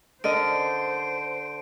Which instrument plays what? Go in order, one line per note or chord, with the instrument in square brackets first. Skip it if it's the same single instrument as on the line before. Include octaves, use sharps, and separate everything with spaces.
[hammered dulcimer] D3 [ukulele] A#4 D#5 [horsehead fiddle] C5 [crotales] D7 D#7